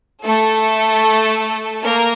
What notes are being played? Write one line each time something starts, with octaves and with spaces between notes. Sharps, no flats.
A3 A4
A#3 A#4